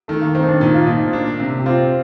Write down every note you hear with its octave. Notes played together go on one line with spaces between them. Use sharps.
D#3 A3
A#3
D#3 C4
D#4
D4
A#2 D#4
F4
A#2 D#4
D4
C3
G4
C4 F4